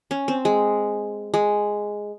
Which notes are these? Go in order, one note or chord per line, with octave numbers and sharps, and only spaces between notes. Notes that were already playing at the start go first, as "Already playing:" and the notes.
C#4
C4
G#3
G#3